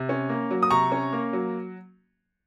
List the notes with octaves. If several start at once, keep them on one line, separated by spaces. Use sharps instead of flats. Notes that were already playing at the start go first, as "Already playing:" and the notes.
Already playing: C3
C#4
A#3
F#3
D#6
C3 A#5 C#6
C#4
A#3
F#3